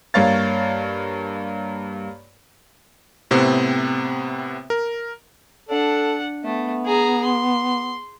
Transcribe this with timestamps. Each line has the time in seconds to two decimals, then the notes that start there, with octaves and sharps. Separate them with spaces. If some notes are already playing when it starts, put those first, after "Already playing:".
0.14 G2 A#3 C#5 F5 A6
3.31 A2 C3 B3 C4
4.70 A#4
5.69 D4 A4 F#5
6.44 A3 B3
6.86 G#4 A#5
7.24 C6